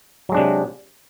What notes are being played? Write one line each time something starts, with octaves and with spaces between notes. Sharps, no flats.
C3 F#3 G#3 D4